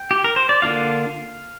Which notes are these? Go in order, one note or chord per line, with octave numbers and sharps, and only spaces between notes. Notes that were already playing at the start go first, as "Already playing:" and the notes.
Already playing: G5
G4
A#4
C5
D5
D3 A#3 D4 F4 F5